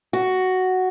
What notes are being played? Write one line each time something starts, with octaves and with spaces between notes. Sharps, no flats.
F#4